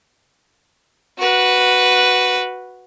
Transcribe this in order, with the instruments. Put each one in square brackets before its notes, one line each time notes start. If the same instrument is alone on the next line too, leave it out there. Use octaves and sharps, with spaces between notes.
[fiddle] F#4 B4